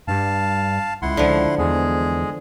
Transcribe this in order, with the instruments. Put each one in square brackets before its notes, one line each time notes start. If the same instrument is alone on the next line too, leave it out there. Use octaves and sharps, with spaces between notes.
[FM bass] G2 [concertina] F5 A5
[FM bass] C#2 [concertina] E4 F#5 C6
[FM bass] C#2 [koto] D3 F3
[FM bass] E2 [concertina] G#3 G#4